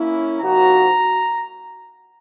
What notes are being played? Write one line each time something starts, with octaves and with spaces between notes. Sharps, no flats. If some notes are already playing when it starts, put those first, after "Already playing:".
Already playing: A#3 C#4 E4
C3 F3 A#3 D#4 F#4 A#5